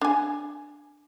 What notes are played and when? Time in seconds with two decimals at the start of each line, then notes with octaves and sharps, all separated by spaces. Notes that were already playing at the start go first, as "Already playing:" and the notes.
0.01 D4 G#5